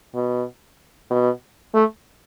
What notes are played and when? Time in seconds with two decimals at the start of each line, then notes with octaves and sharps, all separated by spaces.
0.15 B2
1.10 B2
1.74 A3